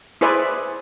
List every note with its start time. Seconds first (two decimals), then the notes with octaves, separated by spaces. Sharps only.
0.21 E4 G#4 B4 C5 D5 E5